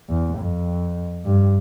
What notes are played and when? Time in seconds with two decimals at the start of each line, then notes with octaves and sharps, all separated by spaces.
0.10 E2
0.39 F2
1.25 G2